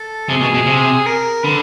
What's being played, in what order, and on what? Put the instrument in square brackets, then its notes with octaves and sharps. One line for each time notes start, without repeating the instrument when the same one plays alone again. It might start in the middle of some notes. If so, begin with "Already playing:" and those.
Already playing: [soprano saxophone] A4
[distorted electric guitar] C3 [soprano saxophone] G#4
[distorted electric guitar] B2
B2
C3
[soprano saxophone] A#4
[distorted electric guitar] D3 [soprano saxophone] B4